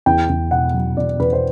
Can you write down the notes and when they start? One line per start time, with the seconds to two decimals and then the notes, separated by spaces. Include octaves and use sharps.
0.06 E2 G5
0.29 E2
0.51 B2 F#5
0.74 F#3
0.97 E2 D5
1.19 E2 B4
1.33 C5